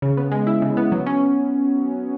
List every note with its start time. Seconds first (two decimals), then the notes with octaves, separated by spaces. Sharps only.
0.02 C#3
0.17 B3
0.32 G#3
0.47 E4
0.62 C#3
0.77 B3
0.92 F#3
1.06 C#4